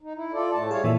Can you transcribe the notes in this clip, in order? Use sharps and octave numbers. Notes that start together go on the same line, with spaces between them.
D#4
E4
F4 A4 D5
A2 A3 A5
G3 G#4 C#5 F5
A#2 E3 A4 E5